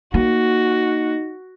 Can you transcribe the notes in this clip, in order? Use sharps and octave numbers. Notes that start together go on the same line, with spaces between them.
A#3 D#4 F#4